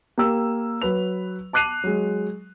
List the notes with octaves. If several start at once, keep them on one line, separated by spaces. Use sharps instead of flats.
A#3 G4 E6
F#3 B4 F7
A5 D6 F#6 C7 D#7 F7
F#3 G#3